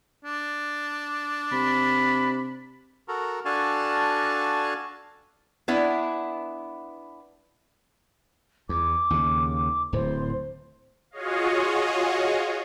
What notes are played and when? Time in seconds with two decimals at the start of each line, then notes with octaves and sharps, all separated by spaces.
0.24 D4
1.52 C3 B5
3.08 F#4 A4 A#4
3.45 D4 F#4 A4 F5 G#5 A5
5.68 B3 D4 E4
8.69 E2 D6
9.10 D#2 C#3
9.93 D1 A2 C5
11.11 F4 F#4 G#4 C#5 D#5 F5